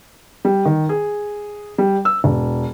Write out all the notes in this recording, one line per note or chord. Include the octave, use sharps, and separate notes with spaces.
G3
D#3
G#4
G3
E6
E1